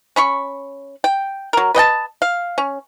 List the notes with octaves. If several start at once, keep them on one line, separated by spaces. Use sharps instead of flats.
C#4 B5 C#6
G5
F#3 A#4
B4 D#5 G5 A5
F5
C#4